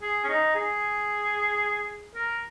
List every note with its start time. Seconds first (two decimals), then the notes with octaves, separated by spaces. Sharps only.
0.02 G#4
0.24 C#4
0.29 D#4
0.55 G#4
2.15 A#4